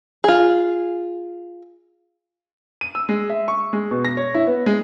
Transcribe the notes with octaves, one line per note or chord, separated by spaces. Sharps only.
F4 G#4
D#7
E6
G#3
E5
C#6
G#3
B2
A#6
C#5
E4
B3
G#3